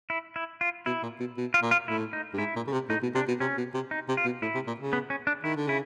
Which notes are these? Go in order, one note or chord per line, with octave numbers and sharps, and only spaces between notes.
E4
E4
F4
B2 E4
A#2
B2
B2
F4
A#2
F4
A2 E4
D#4
G2
G#2 E4
A#2
C#3
C3
A2 D#4
B2
C3 D4
B2
C3 C#4
B2
C3
D#4
C3
F4
B2
A2 E4
C3
A#2
C#3
B3
C#4
D4
D#3 E4
D3
C#3 E4